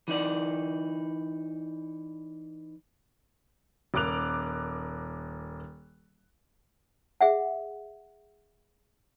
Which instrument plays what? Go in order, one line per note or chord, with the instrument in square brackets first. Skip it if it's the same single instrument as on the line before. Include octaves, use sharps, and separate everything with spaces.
[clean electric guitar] E3 D#4 D5
[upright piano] D#1 A#4 D6 F#6 F7
[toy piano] G#4 E5 F#5